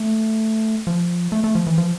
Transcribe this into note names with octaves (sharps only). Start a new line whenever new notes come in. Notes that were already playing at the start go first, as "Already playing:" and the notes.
Already playing: A3
F3
A3
A3
F3
E3
F3